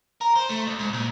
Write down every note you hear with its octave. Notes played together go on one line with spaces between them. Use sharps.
A#4
C5
A3
D2
G#2
A#2